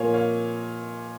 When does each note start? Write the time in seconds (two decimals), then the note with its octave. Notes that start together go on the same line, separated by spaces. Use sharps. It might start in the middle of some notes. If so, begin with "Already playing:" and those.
Already playing: A#2 F3 A#3 C#5 F5 G#5
0.14 C#5 F5